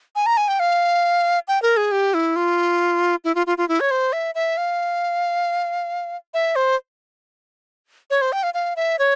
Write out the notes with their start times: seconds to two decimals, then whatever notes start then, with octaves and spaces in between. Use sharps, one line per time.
0.15 G#5
0.26 A#5
0.37 G#5
0.48 G5
0.60 F5
1.48 G5
1.62 A#4
1.77 G#4
1.92 G4
2.14 E4
2.36 F4
3.25 E4
3.35 F4
3.47 F4
3.58 F4
3.69 E4
3.80 C#5
3.91 C5
4.13 E5
4.35 E5
4.57 F5
6.34 E5
6.56 C5
8.10 C#5
8.21 C5
8.32 G5
8.43 F5
8.54 F5
8.76 E5
8.99 C#5